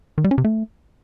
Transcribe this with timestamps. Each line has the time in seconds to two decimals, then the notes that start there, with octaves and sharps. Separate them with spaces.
0.18 D#3
0.24 G3
0.31 C#4
0.38 C3
0.44 A3